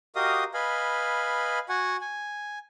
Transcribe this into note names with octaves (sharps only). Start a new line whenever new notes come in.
F#4 G4 A#4 D#5 F5 D#6
B4 D#5 F5 G#5 B5
F#4 F#5 G#5
G#5